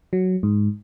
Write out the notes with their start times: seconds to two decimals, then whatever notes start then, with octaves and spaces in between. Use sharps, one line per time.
0.13 F#3
0.43 G#2